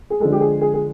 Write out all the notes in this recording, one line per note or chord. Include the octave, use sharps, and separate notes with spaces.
G#4
D3 F3 G#3 A4
G4
G#4
G#4
G#4